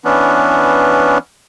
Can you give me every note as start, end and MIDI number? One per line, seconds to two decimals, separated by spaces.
0.05 1.18 52
0.05 1.18 59
0.05 1.18 61
0.05 1.18 62